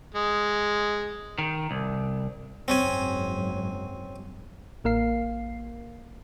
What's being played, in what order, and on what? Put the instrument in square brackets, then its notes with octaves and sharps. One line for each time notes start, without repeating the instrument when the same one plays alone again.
[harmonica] G#3
[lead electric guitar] D#3
C2
[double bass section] F#1 G#2 F#3 [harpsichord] C4 C#4 G#5
[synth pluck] A1 A#3 A#4 F5 C7